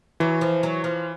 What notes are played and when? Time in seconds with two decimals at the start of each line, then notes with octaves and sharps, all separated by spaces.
0.20 E3 F#3
0.41 F3
0.63 F#3
0.84 F3